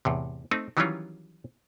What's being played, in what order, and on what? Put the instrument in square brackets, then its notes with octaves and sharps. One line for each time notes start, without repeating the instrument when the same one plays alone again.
[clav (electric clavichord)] E2 A2 C3
A3 C4 D#4
D#3 E3 F#3 G3 C#4 F4